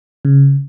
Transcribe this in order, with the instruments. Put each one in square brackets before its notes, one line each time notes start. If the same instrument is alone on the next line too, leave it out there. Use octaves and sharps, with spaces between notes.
[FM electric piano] C#3